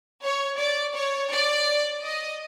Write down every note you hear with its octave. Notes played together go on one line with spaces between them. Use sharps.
C#5
D5
C#5
D5
D#5